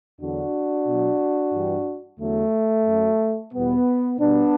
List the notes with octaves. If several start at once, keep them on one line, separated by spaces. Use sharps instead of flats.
E2 D3 F#3 D4 F#4
B2 F#3
G2 E3 G3
E2 D3 F#3 A3
F#2 F#3
E2 B2 G3 B3
B2 G3 B3 D4